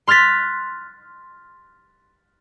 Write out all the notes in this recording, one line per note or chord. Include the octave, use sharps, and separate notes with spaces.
C6 F6 F#6 A6 B6